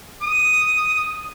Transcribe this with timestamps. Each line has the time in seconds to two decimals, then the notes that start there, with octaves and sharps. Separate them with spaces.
0.22 D#6